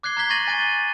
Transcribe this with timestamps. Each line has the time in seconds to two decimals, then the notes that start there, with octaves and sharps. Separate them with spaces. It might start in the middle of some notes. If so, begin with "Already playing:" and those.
0.03 D6 F#6 G#6 C7 G7
0.17 A#5 F#6 G#6 B6 G7
0.30 C#6 F#6 A6 A#6 D#7 F#7
0.47 G#5 A6 D#7 G7